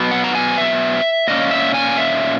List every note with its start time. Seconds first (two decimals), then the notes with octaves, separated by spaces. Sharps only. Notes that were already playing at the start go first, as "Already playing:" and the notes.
Already playing: B2 F#3 B3
0.11 F#5
0.24 A#5
0.35 G#5
0.58 E5
1.28 A#2 A#3 C#4 D#5
1.51 E5
1.74 G#5
1.98 E5